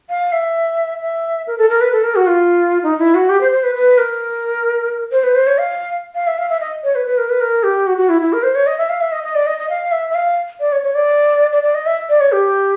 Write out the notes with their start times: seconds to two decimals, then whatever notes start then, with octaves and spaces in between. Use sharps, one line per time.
0.10 F5
0.32 E5
1.01 E5
1.47 A#4
1.58 A4
1.70 A#4
1.81 B4
1.93 A4
2.04 A#4
2.15 F#4
2.27 F4
2.83 D#4
2.99 E4
3.15 F#4
3.29 G4
3.41 C5
3.52 C5
3.63 B4
3.75 B4
3.98 A#4
5.12 C5
5.24 B4
5.35 C5
5.47 C#5
5.58 F5
6.15 F5
6.27 E5
6.38 F5
6.50 E5
6.60 D#5
6.84 C#5
6.95 B4
7.07 B4
7.18 A#4
7.29 B4
7.41 A#4
7.63 G4
7.87 F#4
7.98 F#4
8.09 E4
8.21 E4
8.33 A#4
8.43 C5
8.55 C#5
8.67 D#5
8.78 E5
8.89 F5
9.01 E5
9.12 D#5
9.23 D#5
9.35 D5
9.47 D#5
9.58 D#5
9.70 F5
9.92 E5
10.10 E5
10.15 F5
10.60 D5
10.72 C#5
10.83 C#5
10.95 D5
11.52 D5
11.63 D5
11.75 D#5
11.86 E5
12.09 D5
12.20 C#5
12.32 G4